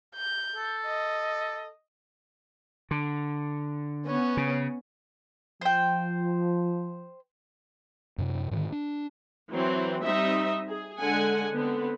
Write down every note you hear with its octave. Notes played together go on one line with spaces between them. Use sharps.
G6
A4
D#5
D3
B3 C#4
C#3
F3 C5 G5
F#2 C3
G#2 D3 D#3
D4
E3 F#3 C4
G3 C4 D#4 D#5 E5
G#4
D3 G#3 F#5 G#5
D3 B3 C4